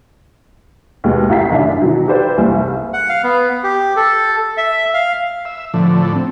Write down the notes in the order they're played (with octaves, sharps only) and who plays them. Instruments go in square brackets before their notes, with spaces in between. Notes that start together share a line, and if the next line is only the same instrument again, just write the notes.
[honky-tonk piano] D#2 B2 G#3 B3
A1 E4 F#5 A#5 B6 C7
F#2 D#3 D4
B2 D#3 E3 F#3
G4 A4 B4 C5 D5
F#1 C2 C3 E3 G#5
[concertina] F#5
F5
B3
G4
A4
E5
F5
[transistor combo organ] E5
[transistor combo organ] A2 D3 [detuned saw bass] F3
[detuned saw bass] C4